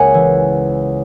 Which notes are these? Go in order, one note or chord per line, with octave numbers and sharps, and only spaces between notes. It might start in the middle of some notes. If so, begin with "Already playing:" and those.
Already playing: C#2 A#3 F#5 G#5
E3